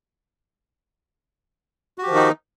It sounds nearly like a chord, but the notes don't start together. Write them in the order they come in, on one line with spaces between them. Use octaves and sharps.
F#4 G4 F3 D#3 D#4